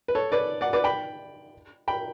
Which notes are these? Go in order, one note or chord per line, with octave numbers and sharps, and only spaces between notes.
B4
A4 C#5
B4 D5
D5 F#5
B4 D5
G5 B5
G5 B5